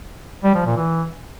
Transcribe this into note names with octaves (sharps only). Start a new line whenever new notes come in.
G3
F3
A#2
E3